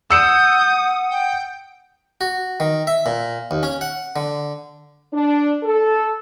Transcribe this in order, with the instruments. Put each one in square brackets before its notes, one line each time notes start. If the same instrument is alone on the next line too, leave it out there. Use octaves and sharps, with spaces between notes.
[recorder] F#5 [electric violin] D#6 [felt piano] E6 C#7 E7 [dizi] G6
[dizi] G5
[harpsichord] F#4
D#3
E5
A#2
D#2
C#4
F#5
D3
[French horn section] D4
A4